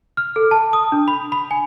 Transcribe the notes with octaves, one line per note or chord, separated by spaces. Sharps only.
F6
A4
A5
D#6
D4
B5
B5
G#5